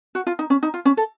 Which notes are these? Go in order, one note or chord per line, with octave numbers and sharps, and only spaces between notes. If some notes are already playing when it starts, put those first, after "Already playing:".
F#4
F4
D#4
C#4
D#4
F4
C#4
A4